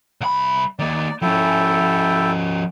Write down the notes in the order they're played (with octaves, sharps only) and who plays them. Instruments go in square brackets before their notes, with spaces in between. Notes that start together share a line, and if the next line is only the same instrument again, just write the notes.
[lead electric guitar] C2 B5
[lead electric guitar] D#3 A#3 [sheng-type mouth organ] D5
[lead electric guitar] F3 C#4 [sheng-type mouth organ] E4 A4 G5